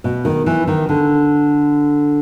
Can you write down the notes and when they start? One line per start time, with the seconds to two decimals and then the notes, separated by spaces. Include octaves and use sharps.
0.04 B2
0.25 D#3
0.46 E3
0.67 D#3
0.89 D3